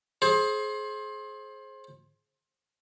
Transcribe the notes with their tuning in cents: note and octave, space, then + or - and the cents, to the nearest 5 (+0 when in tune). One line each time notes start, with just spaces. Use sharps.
G#4 +30 C5 +25